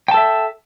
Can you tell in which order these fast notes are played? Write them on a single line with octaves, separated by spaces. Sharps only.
G5 A5 A4 E5